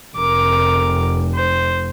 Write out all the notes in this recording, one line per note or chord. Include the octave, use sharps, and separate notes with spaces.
F1 A#4 D6
C5